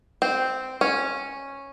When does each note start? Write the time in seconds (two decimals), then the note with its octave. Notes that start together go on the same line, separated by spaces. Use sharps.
0.22 C4
0.81 C#4